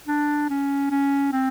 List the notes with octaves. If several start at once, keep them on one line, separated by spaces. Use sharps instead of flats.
D4
C#4
C#4
C4